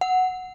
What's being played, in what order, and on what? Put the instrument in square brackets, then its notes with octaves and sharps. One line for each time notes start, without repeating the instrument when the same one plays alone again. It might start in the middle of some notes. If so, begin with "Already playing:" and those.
[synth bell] F#5